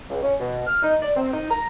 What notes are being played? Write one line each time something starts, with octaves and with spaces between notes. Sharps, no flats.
C#2
C#4
B2
F6
D#4
D5
C4
D#4
A#5